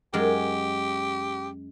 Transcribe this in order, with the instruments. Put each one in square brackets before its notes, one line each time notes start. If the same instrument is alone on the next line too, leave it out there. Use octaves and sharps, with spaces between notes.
[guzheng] F#2 G#3 [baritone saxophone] G4